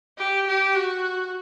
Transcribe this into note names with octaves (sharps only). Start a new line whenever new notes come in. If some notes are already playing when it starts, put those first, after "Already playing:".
G4
G4
F#4